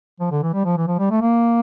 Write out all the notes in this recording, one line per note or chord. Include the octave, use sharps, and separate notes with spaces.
F3
D3
E3
G3
F3
E3
F3
G3
A3
A#3